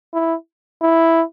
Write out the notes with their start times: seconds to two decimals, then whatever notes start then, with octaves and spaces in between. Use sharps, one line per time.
0.14 E4
0.82 E4